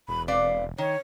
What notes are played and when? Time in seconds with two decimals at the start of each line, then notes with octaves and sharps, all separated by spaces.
0.08 E1 B5
0.28 C4 B4 D5 F5
0.78 D#3 C#5